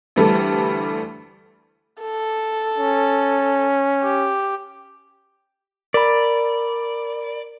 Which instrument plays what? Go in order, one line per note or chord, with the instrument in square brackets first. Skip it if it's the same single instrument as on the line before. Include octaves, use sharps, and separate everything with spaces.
[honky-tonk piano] D2 E3 G3 A3 A4
[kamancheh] A4
[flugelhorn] C#4
[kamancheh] G4
[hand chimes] A#4 B5 [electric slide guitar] D5